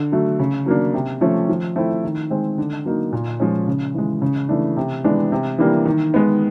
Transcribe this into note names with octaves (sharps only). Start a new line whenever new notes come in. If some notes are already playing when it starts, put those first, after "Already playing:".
Already playing: D3
F#3 A3
C#3
F#3 A#3 D4
C3
F3 A3 C#4
F3
A3 C4 E4
D#3
G#3 C4
D3
F#3 A#3 D#4
A#2
F3 G#3 C#4
C#3
E3 G#3
C#3
E3 A3 D4
C3
E3 G#3 B3 D4
C3
E3 G3 A#3 D4
D#3
G#3 B3